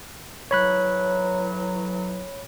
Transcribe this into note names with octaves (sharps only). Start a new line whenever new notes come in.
A2 E3 F#3 C#5 B5 F#6